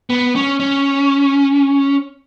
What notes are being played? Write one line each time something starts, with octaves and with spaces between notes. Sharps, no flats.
B3
C#4
C#4